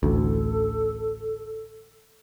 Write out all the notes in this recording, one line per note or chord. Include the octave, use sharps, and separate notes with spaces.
A1 D2 A4